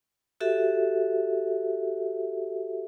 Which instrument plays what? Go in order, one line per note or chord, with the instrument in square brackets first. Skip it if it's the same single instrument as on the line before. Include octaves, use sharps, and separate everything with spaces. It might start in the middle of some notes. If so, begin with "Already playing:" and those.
[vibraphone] F#4 G4 A4 E5